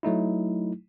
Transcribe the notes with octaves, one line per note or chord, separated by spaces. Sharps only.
F#3 A3 D#4 E4